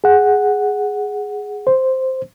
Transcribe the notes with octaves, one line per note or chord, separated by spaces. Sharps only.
G#4 F#5
C5